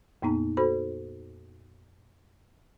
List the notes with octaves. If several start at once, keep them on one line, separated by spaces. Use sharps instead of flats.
F2 A#2 A#3 B3 D#4 A#5
F#4 A4 C5 B5